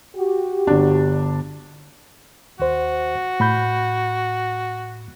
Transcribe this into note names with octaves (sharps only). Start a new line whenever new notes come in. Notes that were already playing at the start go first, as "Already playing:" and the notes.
F#4 G4
G1 D4
D#2 F#4 C5
A2 B5 G6